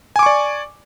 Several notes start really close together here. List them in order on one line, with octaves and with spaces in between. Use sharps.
G#5 D6 C#6 D5